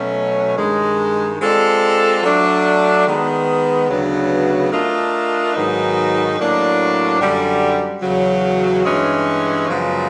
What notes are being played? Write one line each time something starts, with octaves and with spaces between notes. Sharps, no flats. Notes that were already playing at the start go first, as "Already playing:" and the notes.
Already playing: B2 F#3 A3 C#4
G2 D#3 G#3
G#3 C4 F4 A4 D5
F#3 A3 D4
D#3 G#3 B3
D2 C#3 F#3 B3 D4
A3 D4 F4 A#4 D#5
G#2 D#3 F#3 B3 D#4
A2 F#3 A#3 D4
F#2 D3 G3
E2 C#3 F#3
G2 E3 G#3 C#4
F#2 C#3 F3 G#3 B3